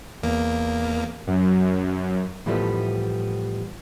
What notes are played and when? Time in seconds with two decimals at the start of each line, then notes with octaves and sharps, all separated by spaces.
0.23 E2 A#3
1.27 F#2
2.46 A2 E3 F3 G3 A3 B3